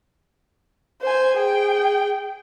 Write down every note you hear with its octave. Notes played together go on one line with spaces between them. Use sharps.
C5 G#5
G#4 G5